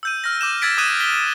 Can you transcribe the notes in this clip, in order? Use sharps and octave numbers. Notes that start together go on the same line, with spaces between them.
E6 G6 D#7
F6 A#6
D6 G6 E7
E6 F6 G#6 A6 B6 D7
D6 D#6 F#6 G#6 D#7 E7
B6 G7